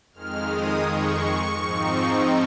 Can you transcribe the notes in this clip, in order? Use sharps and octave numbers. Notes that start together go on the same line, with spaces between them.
F2 D#3 G#3 F6
D#6
C#6
G#2 F3 C4 D#4